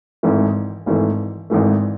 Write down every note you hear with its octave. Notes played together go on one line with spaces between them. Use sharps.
G#1 G#2 E3 A3
G#1 G#2 E3 A3
G#1 G#2 E3 A3